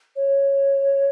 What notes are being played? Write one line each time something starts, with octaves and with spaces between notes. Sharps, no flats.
C#5